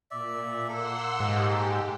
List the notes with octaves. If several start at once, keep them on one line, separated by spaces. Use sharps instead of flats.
A#2 D5 E5
A#3 A4 F#5 C6 E6
G#2 G4